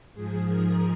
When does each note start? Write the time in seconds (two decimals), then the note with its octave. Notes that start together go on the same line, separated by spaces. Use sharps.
0.14 G#2 F3 G#4
0.47 A#4